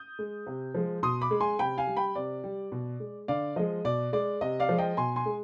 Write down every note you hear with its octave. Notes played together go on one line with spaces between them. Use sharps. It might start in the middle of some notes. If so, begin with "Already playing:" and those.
Already playing: D#6 G6
G#3
C3
F3 G#3
B2 C6 D#6
B5 D6
G#3
G#5 C6
C3 G5 B5
F5 G#5
G3
G5 B5
C3 D5
G3
B2
G#3
D3 D5 F5
F3 G#3 D#5
B2 D5
G#3 D5
C3 D#5
D5 F5
F3 G#3
D#5 G5
B2 G#5 C6
G#5 C6
G#3